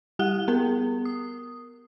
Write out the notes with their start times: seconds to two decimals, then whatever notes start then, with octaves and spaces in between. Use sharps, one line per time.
0.19 G3 G4 F#5 F#6 G7
0.48 B3 A#4
1.05 D#6